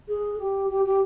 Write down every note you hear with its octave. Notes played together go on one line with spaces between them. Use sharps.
G#4
G4
G4
G4